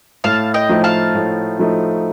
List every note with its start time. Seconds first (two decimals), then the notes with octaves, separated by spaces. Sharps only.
0.24 A2 F5 A5
0.54 D#5 G5
0.69 F3 A3 D#4
0.84 F5 A5
1.15 A2
1.59 F3 A3 D#4